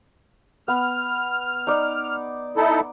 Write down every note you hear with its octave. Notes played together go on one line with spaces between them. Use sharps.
B3 F6
D#4 D5
D#4 E4 A4